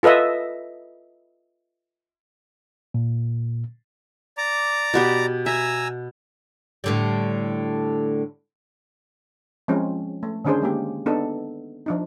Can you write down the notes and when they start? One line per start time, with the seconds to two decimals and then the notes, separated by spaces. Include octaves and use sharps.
0.03 F4 A4 B4 D#5 E5
2.94 A#2
4.38 D5 A#5 D6
4.94 B2 B3 G4
5.46 E5 G#5 A#5 E6
6.84 A2 D3 G3
9.68 F3 G#3 C4 C#4
10.23 A3
10.45 D3 D#3 C#4 D4 G#4 C5
10.62 G#3 A#3 G4
11.06 B3 D4 D#4 A4
11.86 F3 D4 D#4